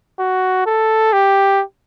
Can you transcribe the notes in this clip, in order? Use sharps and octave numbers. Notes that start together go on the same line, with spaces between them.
F#4
A4
G4